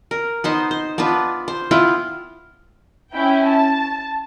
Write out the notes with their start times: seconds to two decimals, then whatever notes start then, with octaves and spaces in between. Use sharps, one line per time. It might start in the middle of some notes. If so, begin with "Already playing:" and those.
0.11 A#4
0.44 B3 D#4 C5
0.71 C5
0.98 B3 D4 F4 B4
1.48 C5
1.71 B3 E4 F4 G5
3.13 C#4 E4 G5
3.47 A5